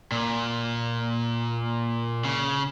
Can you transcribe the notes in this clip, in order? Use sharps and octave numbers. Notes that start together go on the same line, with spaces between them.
A#2
C#3